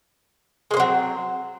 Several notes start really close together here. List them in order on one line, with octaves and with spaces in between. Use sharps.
G#3 A#3 C4 F#3